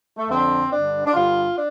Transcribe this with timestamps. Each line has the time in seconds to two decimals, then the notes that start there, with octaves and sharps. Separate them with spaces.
0.17 A3
0.29 F2 D3 C4
0.71 G2 D3 D4
1.05 D4
1.13 G2 D3 F4
1.54 D4